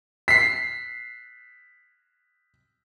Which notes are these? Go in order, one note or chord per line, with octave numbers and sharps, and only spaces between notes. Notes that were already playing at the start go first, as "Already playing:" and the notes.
B6 C7